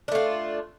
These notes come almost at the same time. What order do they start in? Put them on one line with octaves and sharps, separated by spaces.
D4 A3 F4